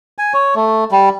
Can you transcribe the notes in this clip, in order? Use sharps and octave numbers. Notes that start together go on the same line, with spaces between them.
G#5
C#5
A3
G3